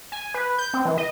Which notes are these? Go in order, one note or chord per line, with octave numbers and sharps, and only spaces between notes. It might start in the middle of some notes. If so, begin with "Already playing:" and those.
G#5
B4
G6
C4
E3
D#5